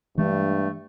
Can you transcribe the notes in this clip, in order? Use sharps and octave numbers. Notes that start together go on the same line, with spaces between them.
G2 E3 G#3 A3 D4